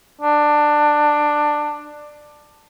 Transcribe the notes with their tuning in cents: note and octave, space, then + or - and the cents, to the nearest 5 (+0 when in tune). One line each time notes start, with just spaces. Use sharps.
D4 +15